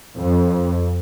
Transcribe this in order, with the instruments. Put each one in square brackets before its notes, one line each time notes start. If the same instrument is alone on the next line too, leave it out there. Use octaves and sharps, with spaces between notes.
[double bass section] F2